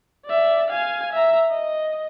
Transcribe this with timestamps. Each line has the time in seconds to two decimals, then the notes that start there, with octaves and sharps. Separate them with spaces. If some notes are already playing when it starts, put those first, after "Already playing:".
0.25 D5 E5
0.70 F5 G#5
1.13 E5 A#5
1.51 D#5